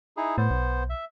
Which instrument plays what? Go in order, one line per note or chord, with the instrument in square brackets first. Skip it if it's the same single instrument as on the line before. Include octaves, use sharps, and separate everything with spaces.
[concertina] D#4 E4 G#4
[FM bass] A2 [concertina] B3 C5
[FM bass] B1
[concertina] E5